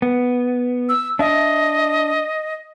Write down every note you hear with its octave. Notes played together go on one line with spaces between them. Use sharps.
B3
E6
D4 D#5 E5